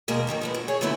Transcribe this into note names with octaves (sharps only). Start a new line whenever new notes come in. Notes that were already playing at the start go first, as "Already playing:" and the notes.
D#2 B2 G#3 A#3 A#5
G#2 D#3 E3 F#3
F3 G#3 B3
F#3
G#4 C#5
D3 E3 F#3 A3 B3 E4